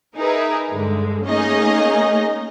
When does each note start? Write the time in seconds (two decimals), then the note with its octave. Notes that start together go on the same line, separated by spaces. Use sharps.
0.17 D#4 G#4 A#4 B4 E5
0.74 G2 D3 G#3
1.28 A3 A#3 C#4 D#4 G#4 D#5